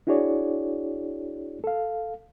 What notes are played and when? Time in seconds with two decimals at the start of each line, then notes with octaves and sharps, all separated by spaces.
0.07 D4 E4 F#4 G#4 C#5 D5
1.64 A4 F5